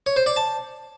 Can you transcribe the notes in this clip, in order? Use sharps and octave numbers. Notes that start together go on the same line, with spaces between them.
C#5
C5
D5
A5